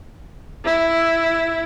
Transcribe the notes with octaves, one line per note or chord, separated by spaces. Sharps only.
E4